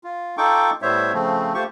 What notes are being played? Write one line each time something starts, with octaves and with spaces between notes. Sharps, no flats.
F4
D#4 F4 A4 G5 C#6 D6
A2 G3 B3 C5 C#5 E5
C#3 F3 A3 C4
A3 F4 G4 C5 C#6